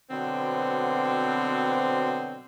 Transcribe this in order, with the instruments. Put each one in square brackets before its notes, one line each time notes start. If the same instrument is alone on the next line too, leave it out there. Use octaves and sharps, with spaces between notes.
[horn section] B2 D3 F#3 B3 C4